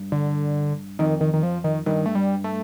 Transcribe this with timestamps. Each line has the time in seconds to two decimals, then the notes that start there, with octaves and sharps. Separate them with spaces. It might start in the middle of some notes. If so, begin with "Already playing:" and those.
Already playing: G2
0.12 D3
0.99 F2 D#3
1.21 D#3
1.33 D#3
1.43 F3
1.64 D#3
1.86 G2 D#3
2.06 A3
2.15 G3
2.44 A3